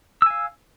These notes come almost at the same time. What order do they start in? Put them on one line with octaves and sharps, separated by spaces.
E6 G#5 F5